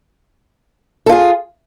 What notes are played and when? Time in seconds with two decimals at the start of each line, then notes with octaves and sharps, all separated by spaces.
1.06 A4
1.09 F4
1.12 G#4